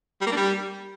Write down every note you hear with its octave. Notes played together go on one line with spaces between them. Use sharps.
G3
A#3
D4
G3